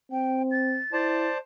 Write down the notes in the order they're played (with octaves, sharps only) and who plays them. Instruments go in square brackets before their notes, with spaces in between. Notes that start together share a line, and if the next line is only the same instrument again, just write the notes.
[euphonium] C4 [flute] G5
[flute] A6
[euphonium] E4 [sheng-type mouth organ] C5 D5 A5